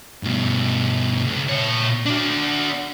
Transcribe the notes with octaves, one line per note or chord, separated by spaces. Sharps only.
G2 B2
C#2
A#2 C#5
D4 F#4